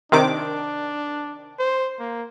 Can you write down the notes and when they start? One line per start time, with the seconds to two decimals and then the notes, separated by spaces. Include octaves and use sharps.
0.12 C3 D#3 D4 D6
1.59 C5
1.99 A#3